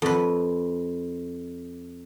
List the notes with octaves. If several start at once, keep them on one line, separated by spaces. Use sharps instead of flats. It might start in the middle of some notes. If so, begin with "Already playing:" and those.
F2 B4